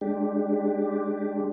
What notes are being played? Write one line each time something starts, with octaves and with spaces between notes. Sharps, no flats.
G#3 D4 G4